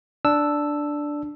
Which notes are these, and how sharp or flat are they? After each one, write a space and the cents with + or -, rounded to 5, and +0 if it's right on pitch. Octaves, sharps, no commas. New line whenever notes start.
D4 +0 E6 +0